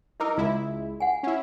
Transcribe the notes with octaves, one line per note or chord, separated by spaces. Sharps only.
D#4 E4 A#4 D6 E6
C#2 G#3 E4 F4 E5
F#5 G#5
C#4 E4